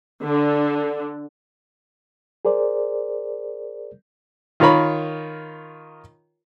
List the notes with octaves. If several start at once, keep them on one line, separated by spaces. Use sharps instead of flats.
D3
G#4 A#4 C5 D5
D#3 F4 A#4 C#5 B5